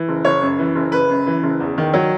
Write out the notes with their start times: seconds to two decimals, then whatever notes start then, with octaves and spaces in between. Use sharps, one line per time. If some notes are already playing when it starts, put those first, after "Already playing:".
Already playing: E3
0.08 F#1
0.25 F#1 C#5
0.42 F#2
0.59 E3
0.75 F#1
0.92 F#1 B4
1.09 F#2
1.27 E3
1.43 F#1
1.60 E2
1.78 D#3
1.94 F#3